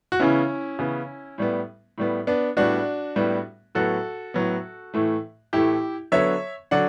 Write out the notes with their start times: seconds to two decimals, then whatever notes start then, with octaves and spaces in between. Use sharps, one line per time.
0.12 F#4
0.19 C#3 E3 B3 C#4 E4
0.79 C#3 E3 B3
1.38 A2 G3 B3
1.98 A2 G3 B3
2.27 B3 D4
2.57 A2 G3 B3 D4 F#4
3.16 A2 G3 B3
3.75 A2 F#3 B3 F#4 A4
4.34 A2 F#3 B3
4.94 A2 E3 A3
5.53 A2 E3 A3 E4 G4
6.12 D3 F#3 B3 C#5 E5
6.71 D3 F#3 D5 F#5